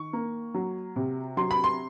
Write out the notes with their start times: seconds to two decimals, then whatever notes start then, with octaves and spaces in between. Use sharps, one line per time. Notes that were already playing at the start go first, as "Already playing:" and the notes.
Already playing: D#3 C#6
0.13 A#3
0.54 F#3
0.96 C3
1.37 F#3 C6
1.51 B5
1.64 C6